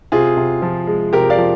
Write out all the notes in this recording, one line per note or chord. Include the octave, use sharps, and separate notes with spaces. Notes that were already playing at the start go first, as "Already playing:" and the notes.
C3 F4 G#4
C3
F3
G#3
C3 G4 A#4
D5 F5
F3